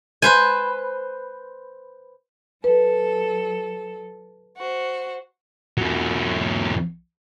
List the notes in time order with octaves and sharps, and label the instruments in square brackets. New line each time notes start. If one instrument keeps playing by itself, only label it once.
[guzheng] B4 C5 G#5
[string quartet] F#3 A4 [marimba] B4
[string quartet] F#4 C5
[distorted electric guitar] E2 F#3